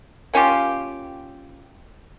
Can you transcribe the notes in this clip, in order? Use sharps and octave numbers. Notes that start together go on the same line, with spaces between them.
A#3 C#4 F4 G4